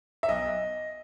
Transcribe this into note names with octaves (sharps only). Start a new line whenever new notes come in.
E5
B1 D#5